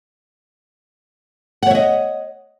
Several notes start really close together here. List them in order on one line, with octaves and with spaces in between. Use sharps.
F#5 C#5 E5 D#5